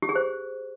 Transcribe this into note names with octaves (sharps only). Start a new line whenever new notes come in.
G4
G#4
C5